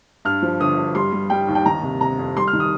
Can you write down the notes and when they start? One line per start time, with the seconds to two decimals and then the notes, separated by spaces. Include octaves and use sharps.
0.25 G2 F6
0.42 F3
0.59 G1 D#6
0.77 G2
0.95 G3 C6
1.13 G3
1.30 G3 G5
1.48 D#2
1.55 G5
1.66 D#3 A#5
1.83 C3
2.01 C3 A#5
2.19 F2
2.37 G3 C6
2.47 F6
2.53 D#3
2.60 D#6